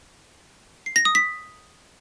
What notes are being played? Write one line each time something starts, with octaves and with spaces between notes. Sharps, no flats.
C7
A#6
D#6
B6